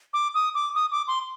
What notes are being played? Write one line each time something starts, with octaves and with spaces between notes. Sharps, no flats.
D6
D#6
D6
D#6
D6
C6